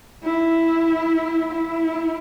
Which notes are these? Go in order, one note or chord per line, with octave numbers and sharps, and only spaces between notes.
E4
E4